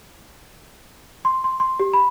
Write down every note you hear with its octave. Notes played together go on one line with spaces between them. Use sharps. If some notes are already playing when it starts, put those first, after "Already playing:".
C6
C6
C6
G4
B5